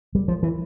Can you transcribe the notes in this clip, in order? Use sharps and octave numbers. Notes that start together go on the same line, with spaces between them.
G3
F3
E3